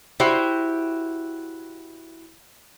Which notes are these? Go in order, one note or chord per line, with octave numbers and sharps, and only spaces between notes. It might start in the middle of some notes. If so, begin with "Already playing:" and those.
E4 F#4 G4 C5